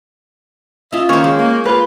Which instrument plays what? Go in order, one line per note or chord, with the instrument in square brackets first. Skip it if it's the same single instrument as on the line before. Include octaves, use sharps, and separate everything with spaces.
[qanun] C#4 F4 [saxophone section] D#5 E5
[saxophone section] D#3 A#3 [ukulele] C#4 [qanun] C5 C#5
[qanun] G#3
[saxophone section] A#3
[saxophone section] A#3 F4 [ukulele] B4